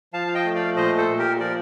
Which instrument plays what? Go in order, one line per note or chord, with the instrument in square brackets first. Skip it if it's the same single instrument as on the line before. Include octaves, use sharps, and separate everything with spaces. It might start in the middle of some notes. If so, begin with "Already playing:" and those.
[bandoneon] F3 F5 A5
F5
D#5 G5
A3
D5 F5
A#2 C5 D#5
A4 C5
A#2
G4 A#4
F3 A#4 D5